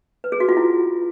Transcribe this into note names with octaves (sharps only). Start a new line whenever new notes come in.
B4
G#4
F#4
F4
E4